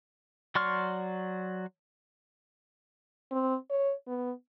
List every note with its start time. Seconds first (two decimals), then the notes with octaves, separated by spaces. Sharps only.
0.55 F#3 D5 C6 C#6 F6
3.31 C4
3.70 C#5
4.07 B3